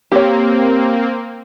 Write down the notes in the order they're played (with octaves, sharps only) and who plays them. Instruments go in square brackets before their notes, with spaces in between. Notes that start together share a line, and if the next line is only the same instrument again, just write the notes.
[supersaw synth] A#3 C4 [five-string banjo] G4 C#5